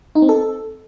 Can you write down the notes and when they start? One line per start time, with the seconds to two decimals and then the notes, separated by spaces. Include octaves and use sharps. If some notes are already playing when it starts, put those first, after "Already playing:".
0.15 D#4
0.22 C4
0.29 A4